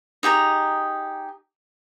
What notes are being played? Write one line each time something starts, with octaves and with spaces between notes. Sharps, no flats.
D#4 G4 G#4 A#5